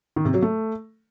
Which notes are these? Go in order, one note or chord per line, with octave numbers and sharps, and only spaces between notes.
D#3
C3
F#3
A3